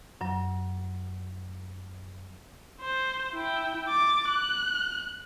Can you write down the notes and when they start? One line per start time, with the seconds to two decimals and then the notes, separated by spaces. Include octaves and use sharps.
0.21 F#2 F#3
2.81 C5
3.33 E4 G5
3.88 D6 A6
4.28 F#6